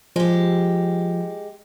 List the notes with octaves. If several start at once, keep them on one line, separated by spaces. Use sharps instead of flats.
F3 G#3 G4